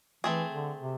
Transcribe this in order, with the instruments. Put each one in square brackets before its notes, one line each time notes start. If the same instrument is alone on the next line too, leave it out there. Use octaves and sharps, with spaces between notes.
[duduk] E3 [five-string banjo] A3 C4 G#4
[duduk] D3
C3